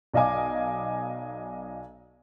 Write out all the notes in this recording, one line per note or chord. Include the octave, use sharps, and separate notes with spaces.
B1 D5 D#5 F5 G#5 D6